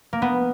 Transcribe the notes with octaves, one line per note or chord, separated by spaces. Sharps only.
A#3
B3